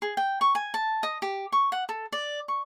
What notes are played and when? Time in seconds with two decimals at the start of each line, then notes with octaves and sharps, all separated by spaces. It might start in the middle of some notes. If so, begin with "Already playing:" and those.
0.02 G#4
0.17 G5
0.41 C#6
0.55 G#5
0.74 A5
1.03 D#5
1.22 G4
1.52 C#6
1.72 F#5
1.89 A4
2.12 D5
2.48 C#6